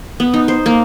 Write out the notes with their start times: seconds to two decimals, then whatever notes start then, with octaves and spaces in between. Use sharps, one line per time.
0.20 B3
0.34 D#4
0.48 C5
0.66 A#3